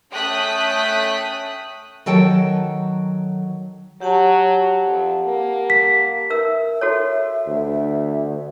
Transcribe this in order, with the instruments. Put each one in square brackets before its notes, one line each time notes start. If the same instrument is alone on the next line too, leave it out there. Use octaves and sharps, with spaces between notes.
[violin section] A3 C#4 G5 D#6 F#6 B6
[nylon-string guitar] D#3 F#3 A4 G5 A5
[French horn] F#3 [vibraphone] G4 F#5 A5
[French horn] F2
A#3
[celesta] B6
[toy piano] A#4 E6 [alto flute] E5
[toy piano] F#4 A4 C#5
[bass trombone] D2